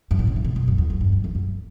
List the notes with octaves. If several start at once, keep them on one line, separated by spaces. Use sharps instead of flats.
F#2
A2
C#3
D3
B2
F#2
F#2
E2
F#2
G2
F#2
E2
F#2